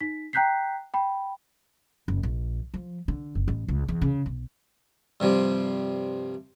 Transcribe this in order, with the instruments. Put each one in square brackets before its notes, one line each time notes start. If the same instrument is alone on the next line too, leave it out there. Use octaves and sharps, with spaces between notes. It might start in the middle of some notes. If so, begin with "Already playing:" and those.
[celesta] D#4 B6
G5 A#5 F#6 G6 B6 C7
G5 B5
[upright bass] F#1
A#1
F3
D3
F#1
A1
C#2
E2
C#3
B1
[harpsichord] G2 C3 F3 G3